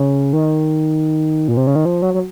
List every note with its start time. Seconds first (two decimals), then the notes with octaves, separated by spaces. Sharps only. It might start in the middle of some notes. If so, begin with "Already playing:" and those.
Already playing: C#3
0.33 D#3
1.48 A#2
1.57 C3
1.67 C#3
1.75 D#3
1.85 F3
2.02 F#3
2.14 F#3